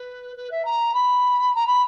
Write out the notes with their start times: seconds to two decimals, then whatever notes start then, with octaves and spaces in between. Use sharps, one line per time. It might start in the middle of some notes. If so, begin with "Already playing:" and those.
Already playing: B4
0.36 B4
0.50 E5
0.64 A#5
0.93 B5
1.55 A#5
1.66 B5